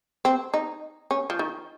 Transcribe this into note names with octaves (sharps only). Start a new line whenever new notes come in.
C4
D#4
C#4
F3
D#3